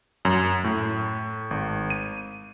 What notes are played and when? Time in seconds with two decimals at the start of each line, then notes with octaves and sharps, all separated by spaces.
0.25 F#2
0.64 A2
1.51 G#1
1.90 D#7